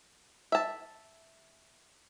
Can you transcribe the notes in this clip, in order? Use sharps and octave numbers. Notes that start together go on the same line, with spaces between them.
E5 A5